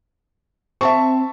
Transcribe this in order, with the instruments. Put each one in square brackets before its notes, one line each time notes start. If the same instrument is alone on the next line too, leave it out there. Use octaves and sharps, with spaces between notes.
[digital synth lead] C4 [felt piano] E5 A5 C#6